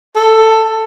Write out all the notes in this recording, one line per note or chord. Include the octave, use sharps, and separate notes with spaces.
A4